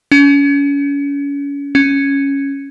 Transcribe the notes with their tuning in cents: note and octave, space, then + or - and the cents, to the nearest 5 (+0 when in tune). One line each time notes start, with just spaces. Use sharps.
C#4 +35
C#4 +0